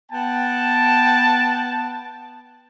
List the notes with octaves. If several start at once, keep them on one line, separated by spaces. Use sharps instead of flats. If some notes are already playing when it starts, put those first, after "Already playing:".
B3 G5 A5